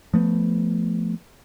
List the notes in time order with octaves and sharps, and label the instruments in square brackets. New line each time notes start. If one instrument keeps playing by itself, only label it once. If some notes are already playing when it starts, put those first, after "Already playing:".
[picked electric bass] F3 A3 B3